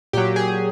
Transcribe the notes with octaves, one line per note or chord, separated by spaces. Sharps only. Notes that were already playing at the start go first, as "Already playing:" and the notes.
A#2 F#3 G4
G#4